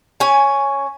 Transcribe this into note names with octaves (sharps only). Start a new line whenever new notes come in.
C#4 G#5